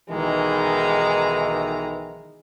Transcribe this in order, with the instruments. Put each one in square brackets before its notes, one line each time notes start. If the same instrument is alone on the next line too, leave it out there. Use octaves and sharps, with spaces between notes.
[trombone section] B1 D#3 E3 [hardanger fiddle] G#3 A#5